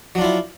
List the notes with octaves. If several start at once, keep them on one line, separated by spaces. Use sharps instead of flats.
F#3 D4 E4 F4